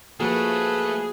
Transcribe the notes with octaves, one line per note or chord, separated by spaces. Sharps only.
F3 A3 A#3 F#4 G#4 B4